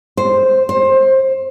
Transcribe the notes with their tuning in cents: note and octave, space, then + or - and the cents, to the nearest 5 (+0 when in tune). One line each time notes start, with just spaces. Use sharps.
C5 +0
C5 +20